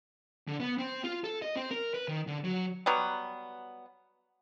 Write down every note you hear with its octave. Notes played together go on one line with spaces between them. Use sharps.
D3
B3
C4
F4
A4
D#5
C4
A#4
B4
D#3
D3
F#3
F#3 G3 B3